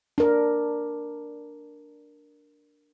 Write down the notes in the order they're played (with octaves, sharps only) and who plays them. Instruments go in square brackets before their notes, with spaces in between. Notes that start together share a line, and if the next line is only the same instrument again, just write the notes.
[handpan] D4 A#4